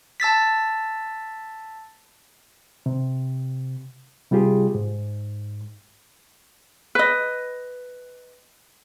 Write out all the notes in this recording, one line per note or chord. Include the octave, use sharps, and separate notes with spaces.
A5 E6 A6 B6
C3
C3 G3 F4 G4 G#4
G#2
B4 D#5